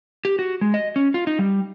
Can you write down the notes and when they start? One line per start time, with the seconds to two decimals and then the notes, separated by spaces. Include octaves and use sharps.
0.25 G4
0.39 F#4
0.61 G#3
0.74 D#5
0.96 C#4
1.14 F4
1.27 D#4
1.39 G3